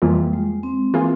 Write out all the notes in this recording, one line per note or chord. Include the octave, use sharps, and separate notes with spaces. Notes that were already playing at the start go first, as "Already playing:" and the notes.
F2 E3 G3 A#3 F4 G#4
G#3
C4
E3 A#3 F4 G#4